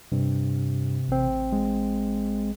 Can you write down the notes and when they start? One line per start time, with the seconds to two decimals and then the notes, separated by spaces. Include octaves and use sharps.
0.12 G2 C3
1.08 A1 C4
1.52 G#3